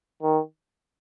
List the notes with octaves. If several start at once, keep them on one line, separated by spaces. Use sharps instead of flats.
D#3